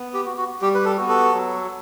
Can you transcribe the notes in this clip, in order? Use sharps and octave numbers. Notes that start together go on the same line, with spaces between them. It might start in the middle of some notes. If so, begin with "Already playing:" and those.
Already playing: B3
G4
F#4
F#4
G3 G4
B4
A4
B3 F#4
A4
F#3